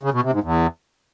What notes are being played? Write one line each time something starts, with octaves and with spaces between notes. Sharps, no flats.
C#3
B2
C3
G#2
E2